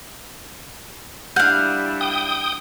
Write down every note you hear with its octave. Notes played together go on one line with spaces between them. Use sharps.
G3 D4 E4 F5 F#5 G6
G5 D#6